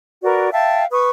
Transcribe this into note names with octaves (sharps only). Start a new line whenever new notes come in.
F#4 A#4 B4 D5
E5 F5 G5 A5
B4 C#6 D#6